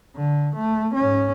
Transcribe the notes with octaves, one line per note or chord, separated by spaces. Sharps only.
D3
A3
G#2 C#4